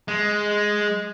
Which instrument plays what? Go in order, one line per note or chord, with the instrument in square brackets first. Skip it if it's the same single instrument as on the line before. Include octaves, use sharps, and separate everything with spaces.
[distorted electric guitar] G#3